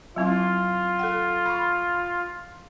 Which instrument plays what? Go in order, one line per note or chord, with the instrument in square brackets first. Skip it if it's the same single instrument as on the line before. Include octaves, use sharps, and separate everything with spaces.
[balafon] F#3 C4 E4 [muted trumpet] F4
[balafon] A4 F#5
B5 C#6